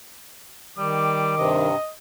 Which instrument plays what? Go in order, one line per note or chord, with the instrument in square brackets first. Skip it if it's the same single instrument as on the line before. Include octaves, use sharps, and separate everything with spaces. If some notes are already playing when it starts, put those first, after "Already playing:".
[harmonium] D#3 [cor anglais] G3 [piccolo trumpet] D6
[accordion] G2 C3 [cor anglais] D#5